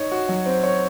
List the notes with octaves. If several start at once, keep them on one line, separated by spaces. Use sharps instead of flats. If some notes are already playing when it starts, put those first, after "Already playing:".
Already playing: D#4 C#5
F#4
F#3
C4
C#5